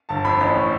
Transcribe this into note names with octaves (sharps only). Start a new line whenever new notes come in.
G1 A5
F2 B5
A1 B5
A2